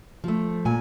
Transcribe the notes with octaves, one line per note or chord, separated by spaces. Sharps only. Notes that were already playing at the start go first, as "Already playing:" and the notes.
F3 A3
A#2 G#5